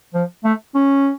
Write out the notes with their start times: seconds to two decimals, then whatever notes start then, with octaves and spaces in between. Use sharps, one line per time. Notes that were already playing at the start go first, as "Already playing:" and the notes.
0.14 F3
0.44 A3
0.75 C#4